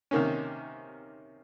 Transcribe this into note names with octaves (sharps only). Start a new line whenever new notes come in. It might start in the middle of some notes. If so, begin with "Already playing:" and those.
C3 D#3 A#3 C#4